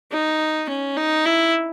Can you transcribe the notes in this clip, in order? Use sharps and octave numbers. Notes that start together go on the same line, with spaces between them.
D#4
C#4
D#4
E4